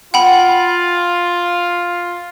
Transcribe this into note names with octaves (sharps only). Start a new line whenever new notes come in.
F4 F#5 G5 B5